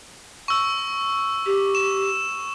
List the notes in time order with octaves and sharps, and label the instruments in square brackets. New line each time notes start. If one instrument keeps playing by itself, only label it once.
[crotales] C#6 E6
[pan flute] G4
[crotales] E7